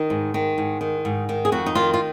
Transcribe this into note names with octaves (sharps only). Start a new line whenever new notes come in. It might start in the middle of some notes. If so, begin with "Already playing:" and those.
Already playing: D#3 D#4
G#2
D#3
G#2
D#3
G#2
D#3
G#4
F2 F#4
D#4
D#3 F4
F4